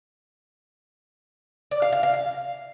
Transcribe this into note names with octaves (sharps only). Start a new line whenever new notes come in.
D5
F5
F5
F5
F5